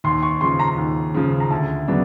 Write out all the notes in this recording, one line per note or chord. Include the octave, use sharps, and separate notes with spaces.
D#2 C6
C#6
C#3 F3 C6
A#5
D#2
C#3 F3
A#5
D2 A5
C#3 F#3 B3 D4